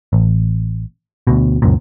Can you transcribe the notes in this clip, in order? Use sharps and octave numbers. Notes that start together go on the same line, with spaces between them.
A1
D2 B2
C#2 F#2 A#2